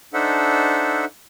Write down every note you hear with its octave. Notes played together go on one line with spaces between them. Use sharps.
D4 D#4 A4 C5 E5 F#5